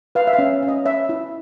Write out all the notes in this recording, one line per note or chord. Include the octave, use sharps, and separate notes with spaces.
B4 F5
E5
F5
C#4
C#4
D#5
C#5 E5
E4